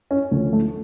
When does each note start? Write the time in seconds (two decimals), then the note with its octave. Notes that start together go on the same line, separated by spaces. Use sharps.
0.11 C#4
0.31 D2 D3 F3
0.53 A3